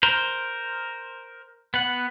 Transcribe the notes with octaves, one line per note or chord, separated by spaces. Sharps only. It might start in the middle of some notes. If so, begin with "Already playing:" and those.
A#4 C5
B3 F#5